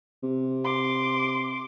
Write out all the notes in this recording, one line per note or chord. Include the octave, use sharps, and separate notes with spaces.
C3
C6 D6